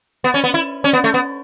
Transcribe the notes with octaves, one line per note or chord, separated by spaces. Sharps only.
B3
C#4
B3
E4
C#4
B3
A3
B3